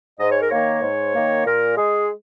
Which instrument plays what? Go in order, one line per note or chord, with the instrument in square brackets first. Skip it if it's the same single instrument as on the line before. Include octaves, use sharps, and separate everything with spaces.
[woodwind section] G#2 D#5
C#5
A#4
D#3 A#3 C#5
G#2
D#3 A#3
A#2 A#4
G#3 G#4